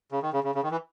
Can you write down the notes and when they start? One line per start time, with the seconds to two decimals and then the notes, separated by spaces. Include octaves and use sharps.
0.12 C#3
0.22 D#3
0.33 C#3
0.44 C#3
0.55 C#3
0.63 D#3
0.71 E3